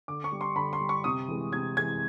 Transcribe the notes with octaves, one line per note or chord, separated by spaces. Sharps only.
D3 D6
C#6
G3
C6
D3 B5
C6
G3
C#6
C3 D#6
E3 G#3
C3 G#6
E3 G#3 G#6